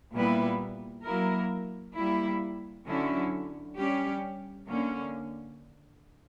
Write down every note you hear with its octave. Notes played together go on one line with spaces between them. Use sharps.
A#2 G3 B3 E4 B4
F#3 A#3 E4 A#4
G3 A#3 E4
D3 F#3 C#4 E4
G3 C#4 G4
D3 A#3 C#4